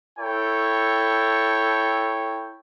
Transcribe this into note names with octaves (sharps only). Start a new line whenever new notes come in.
E4 A4 C#5 G5